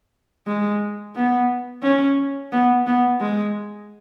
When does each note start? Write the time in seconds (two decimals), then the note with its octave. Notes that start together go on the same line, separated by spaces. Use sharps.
0.47 G#3
1.16 B3
1.83 C#4
2.52 B3
2.87 B3
3.21 G#3